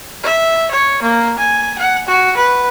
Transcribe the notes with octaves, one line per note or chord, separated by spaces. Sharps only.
E5
C#5
A#3
G#5
F#5
F#4
B4